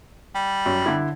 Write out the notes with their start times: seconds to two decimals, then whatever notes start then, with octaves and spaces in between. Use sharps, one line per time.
0.35 G3
0.66 F#2
0.86 D3 E4